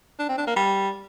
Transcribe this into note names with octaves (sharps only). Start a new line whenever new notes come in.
D4
C4
D4
A#3
G3